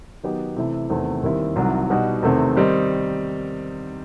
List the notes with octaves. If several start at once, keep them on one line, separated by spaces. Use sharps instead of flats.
D#3 F#3 B3 D#4 G4
C3 E3 A3 E4
E2 C3 D#3 A3 C4
D#2 D#3 G3 C4 E4
C2 C3 D#3 F#3
B2 G3 D#4 F#4
E2 C3 D#3 A3 C4
D#3 G3 C4 D#4